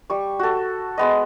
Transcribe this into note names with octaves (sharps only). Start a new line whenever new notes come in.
G3 C#6
F#4 A4
G#3 B3 D#5